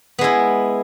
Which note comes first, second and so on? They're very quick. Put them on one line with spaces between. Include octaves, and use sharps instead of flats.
B3 G#3 E4